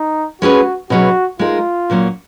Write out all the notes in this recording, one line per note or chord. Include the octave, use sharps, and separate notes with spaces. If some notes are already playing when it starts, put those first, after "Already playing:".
Already playing: D#4
G#3 C#4 F#4 G#4 B4
B2 F#3 C#4 F#4 G#4 B4
G#3 D#4 F4 A#4
A#2 F#3 A#3 C#4